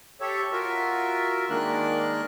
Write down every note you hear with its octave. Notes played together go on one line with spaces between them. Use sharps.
G4 A4 C#5 E5
F4 F#4 A#4 E5
D#3 G#3 A#3 D4 A#4 F#6